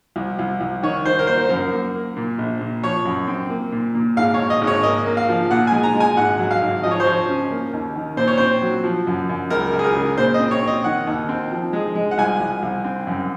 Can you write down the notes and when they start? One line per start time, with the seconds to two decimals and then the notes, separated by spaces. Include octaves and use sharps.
0.16 C2
0.39 C2
0.60 C2
0.83 D#3 C#5
1.05 D#3 C5
1.19 A#4
1.27 A#3 C5
1.44 C5
1.49 F#2 A#4
1.72 A#3
1.95 A#3
2.16 A#2
2.39 A#1
2.60 A#2
2.83 F3 C#5
3.05 F#2
3.28 C4
3.50 A#3
3.72 A#2
3.95 A#2
4.17 G#1 F5
4.34 C#5
4.39 G#1
4.50 D#5
4.61 G#1
4.67 C#5
4.83 A#3 D#5
5.06 A#3
5.17 F5
5.29 F3
5.51 A#2 F#5
5.67 G#5
5.72 G#3
5.83 A#5
5.95 G#3
6.00 G#5
6.17 G#1 F#5
6.39 F#3
6.51 F5
6.62 G#1
6.83 F3 D#5
6.91 C#5
7.00 C5
7.07 F3 C#5
7.29 C#4
7.51 A#3
7.73 D#2
7.96 D#3
8.17 A#2 C5
8.27 C#5
8.38 C4 C5
8.62 F#3
8.84 F3
9.07 F#2
9.29 F#2
9.50 C#2 A#4
9.73 C#2
9.79 G#4
9.84 A#4
9.95 C#3
10.18 A#2 C5
10.34 D#5
10.40 C4
10.51 C#5
10.62 C4
10.67 D#5
10.84 D#3 F#5
11.07 D#2
11.29 C4
11.51 F3
11.73 G#3
11.95 G#3
12.11 F#5
12.18 C2 G#5
12.40 C2
12.63 C2
12.84 C4
13.07 F#2